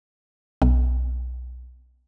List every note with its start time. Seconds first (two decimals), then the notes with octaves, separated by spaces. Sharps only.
0.62 B1